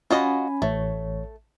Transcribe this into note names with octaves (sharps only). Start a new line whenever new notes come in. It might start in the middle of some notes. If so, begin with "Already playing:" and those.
C#4 F4 F#4 D#5 G#5 B5
A1 A3 C#5